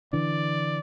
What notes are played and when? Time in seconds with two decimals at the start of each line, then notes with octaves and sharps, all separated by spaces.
0.13 D3 E3 D4 D5